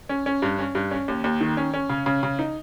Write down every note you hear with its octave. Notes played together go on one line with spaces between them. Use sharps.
C#4
C#4
G2
C#4
G2
C#4
D#2
D#2
D#3
C#4
C#4
C#3
C#3
C#3
D#4